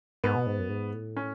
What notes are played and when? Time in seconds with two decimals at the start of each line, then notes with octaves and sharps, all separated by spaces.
0.24 G#2 B3
0.36 B2
0.46 G#2
0.59 F#2
0.69 G#2
0.93 A2
1.17 C#4